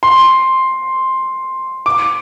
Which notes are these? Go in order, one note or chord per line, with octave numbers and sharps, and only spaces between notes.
C6
D6